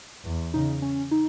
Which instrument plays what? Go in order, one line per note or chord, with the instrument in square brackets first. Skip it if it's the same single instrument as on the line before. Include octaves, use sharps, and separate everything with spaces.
[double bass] E2
[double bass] C#3 [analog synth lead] D#4
[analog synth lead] C#4
D#4